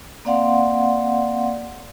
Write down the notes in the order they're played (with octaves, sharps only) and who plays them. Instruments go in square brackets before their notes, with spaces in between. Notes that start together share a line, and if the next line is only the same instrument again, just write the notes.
[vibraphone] A#3 C4 D5 F5 F#5 C6